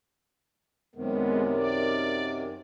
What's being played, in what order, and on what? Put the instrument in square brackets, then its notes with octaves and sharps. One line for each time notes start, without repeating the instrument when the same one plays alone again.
[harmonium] F#2 C3 D#3 [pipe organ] G#3 B3
[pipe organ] D5